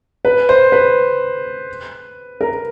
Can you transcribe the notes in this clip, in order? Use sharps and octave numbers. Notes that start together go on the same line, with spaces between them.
B4
C5
B4
A#4